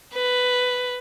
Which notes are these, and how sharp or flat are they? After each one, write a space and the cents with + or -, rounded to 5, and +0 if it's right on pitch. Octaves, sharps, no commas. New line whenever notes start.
B4 +10